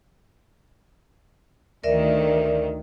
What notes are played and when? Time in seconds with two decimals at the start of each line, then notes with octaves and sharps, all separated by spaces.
1.84 D2 D#3 A#4 D5 E5